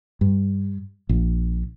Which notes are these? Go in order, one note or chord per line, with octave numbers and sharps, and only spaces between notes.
G2
A#1